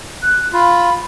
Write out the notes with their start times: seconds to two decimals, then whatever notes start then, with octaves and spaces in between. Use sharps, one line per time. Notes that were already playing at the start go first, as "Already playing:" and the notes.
0.22 F#6
0.53 F4 B5